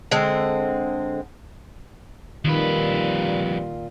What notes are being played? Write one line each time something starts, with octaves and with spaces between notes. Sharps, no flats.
D3 G#3 C4
F2 A#2 D#3 G3 F4 B4